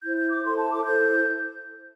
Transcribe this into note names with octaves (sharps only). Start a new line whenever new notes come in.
E4 C5 G6
G6
D6
E4 A4 C5 C6
A5
D6
E4 A4 C5 G6